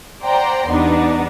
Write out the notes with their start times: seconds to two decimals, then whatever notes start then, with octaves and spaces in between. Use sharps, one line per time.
0.24 C5 D5 F#5 G5 A#5 C6
0.70 E2 G3 B3 D4 D#4